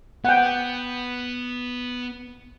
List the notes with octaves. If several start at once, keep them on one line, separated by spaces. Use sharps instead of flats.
B3 F#5 G5